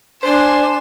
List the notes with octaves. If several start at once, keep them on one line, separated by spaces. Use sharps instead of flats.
D4 C5 G#5 C6 E7